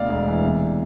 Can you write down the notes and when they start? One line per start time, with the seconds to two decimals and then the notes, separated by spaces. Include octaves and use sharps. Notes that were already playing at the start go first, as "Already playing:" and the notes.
Already playing: D2 B2 D5 F5
0.10 E1
0.27 E3
0.44 C3